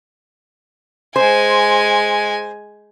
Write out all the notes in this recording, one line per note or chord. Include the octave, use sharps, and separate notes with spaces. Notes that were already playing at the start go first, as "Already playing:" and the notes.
G#3 C5 G#5